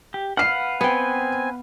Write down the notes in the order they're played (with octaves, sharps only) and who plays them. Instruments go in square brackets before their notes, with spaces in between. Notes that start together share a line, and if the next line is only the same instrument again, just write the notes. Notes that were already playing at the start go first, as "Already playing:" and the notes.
[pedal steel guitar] G4
[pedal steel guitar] B4 F5 F#5 [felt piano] F6 C7
[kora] B3 G5 [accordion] C4 G#5